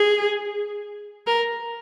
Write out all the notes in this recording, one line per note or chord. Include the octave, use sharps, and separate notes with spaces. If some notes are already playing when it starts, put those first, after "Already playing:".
Already playing: G#4
A#4